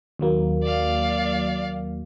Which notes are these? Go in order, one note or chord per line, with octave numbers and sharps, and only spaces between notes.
D#2 F#3 A#3
D5 F5